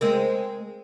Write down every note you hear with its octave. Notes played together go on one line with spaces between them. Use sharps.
G#3 C4 A#4